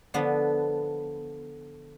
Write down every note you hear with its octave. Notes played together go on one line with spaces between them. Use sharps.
D3 F3 B3